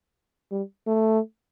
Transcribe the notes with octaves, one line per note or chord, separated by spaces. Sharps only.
G3
A3